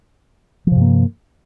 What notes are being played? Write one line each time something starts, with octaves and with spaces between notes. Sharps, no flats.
G2 C3 F3 A#3